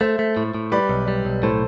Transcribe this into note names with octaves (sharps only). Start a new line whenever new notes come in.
A3 C5 E5
A3
A2
A2
G3 B4 D5
B1
G3
B1
A2 A4 C5